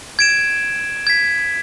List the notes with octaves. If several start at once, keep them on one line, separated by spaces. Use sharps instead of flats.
G#6 D7 E7
G#6 B6